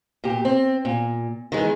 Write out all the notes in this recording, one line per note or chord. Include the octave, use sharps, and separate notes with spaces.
A#2 G4
C4
A#2
D#3 E3 G#3